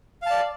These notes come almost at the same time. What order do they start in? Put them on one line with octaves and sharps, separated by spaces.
F5 A5 D5